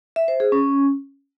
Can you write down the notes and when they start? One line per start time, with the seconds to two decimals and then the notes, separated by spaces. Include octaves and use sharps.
0.16 E5
0.28 C5
0.40 G#4
0.52 C#4